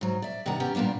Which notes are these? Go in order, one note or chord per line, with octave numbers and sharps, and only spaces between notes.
G#2 F#3
D5 E5
G2 C3 D#3 D5 F#5 A#5
B3 C#4 G4
A#2 G3 A#3 B3 D4